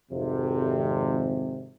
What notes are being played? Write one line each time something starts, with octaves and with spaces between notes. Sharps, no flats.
G#1 F2 C3